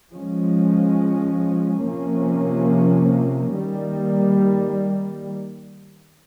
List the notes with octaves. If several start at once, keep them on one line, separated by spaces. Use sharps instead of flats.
F3 G#3 C#4
C3 F3 A#3 C#4
D#3 G3 A#3